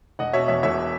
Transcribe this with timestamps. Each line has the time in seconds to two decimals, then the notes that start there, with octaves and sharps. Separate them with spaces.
0.19 E1 D#5 F#5
0.33 B2 C#5 E5
0.48 E2 C#5 E5
0.63 E1 C#5 E5